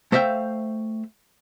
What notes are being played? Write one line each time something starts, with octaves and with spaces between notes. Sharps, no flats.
A3 C5 E5 F5 G5